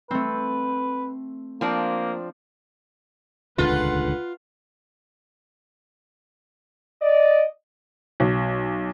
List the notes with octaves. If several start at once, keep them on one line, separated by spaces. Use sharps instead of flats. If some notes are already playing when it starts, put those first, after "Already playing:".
A3 C4 B4
F3 A#3 C4 D4
D#1 C#2 D3 F4 B4 F#5
D5 D#5
B1